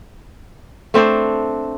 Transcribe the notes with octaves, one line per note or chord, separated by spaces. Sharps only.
A3 C4 D4 C5